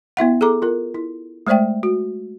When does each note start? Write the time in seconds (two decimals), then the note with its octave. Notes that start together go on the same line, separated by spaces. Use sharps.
0.17 B3 E4 E5 F#5
0.41 G#4 A4 A#5 D6
0.62 F4 A#4
0.94 E4
1.47 G#3 A3 C5 D5 E5 G5
1.83 F#4